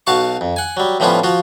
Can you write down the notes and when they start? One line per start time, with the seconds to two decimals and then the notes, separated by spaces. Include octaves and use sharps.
0.07 B1 F#4 F5 A5 C#6
0.41 F2
0.56 F#5 G#5
0.77 F#3 G3
1.00 A2 F3 G3 B3 C#4 F4
1.24 F3 F4 F#4